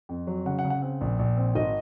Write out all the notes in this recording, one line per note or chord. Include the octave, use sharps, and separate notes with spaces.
F2
F#3
C#3 F#5
F#5
C#3
F#5
C4
A#1
A#1
C4
G#1 D#5